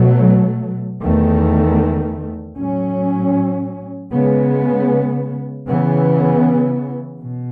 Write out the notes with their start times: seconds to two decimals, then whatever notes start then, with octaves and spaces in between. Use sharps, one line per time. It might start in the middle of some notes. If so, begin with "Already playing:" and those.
Already playing: B2 F#3 A3
1.02 E2 D#3 A3
2.57 A2 F#3 C#4
4.11 C#3 G#3 B3
5.67 C#3 E3 B3
7.21 B2